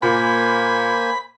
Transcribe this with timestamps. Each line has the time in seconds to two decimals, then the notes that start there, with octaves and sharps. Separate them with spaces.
0.02 A#2 A#3 C5 G#5 B5